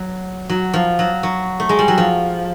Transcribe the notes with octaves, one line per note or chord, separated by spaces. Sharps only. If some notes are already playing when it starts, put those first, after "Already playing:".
Already playing: F#3
F#3
F3
F#3
F#3
A3
G#3
G3
F#3
F3